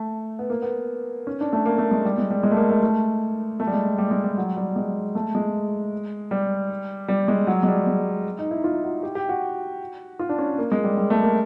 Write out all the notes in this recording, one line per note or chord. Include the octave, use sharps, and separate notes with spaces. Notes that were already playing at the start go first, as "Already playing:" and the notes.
Already playing: A3
B3
A#3
B3
C#4
D4
A3
A#3
A3
G#3
G3
G#3
G3
G#3
A3
A#3
A3
A3
A3
G3
G#3
G3
G#3
G3
F#3
G3
G#3
A3
G#3
G3
G3
G#3
F#3
G#3
G3
G#3
D#4
E4
F4
F#4
G4
G4
F#4
F4
D4
C#4
A#3
G#3
G3
G3
A3
A#3